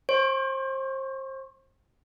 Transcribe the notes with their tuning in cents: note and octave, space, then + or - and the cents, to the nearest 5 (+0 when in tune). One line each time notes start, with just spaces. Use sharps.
C5 +30 C#6 -5